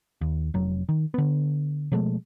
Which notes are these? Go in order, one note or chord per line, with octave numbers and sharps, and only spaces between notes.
D#2
F1 F#3
D#3
D3 B3
B2 F3 G#3 A3